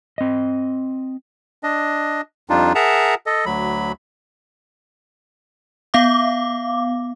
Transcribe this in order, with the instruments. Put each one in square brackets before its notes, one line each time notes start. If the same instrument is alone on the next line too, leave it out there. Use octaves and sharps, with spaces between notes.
[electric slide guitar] C4 D#5
[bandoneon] D4 D#5
F2 G3 D4 D#4 F4
G#4 A#4 E5 F#5 A5 A#5
A4 D#5
D2 F#3 B5
[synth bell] B3 F5 D6